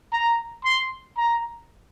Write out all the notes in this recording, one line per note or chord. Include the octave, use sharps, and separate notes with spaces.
A#5
C6
A#5